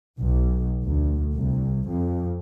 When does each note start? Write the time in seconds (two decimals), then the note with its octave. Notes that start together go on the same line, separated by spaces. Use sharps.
0.19 B1
0.84 D2
1.33 C2
1.88 F2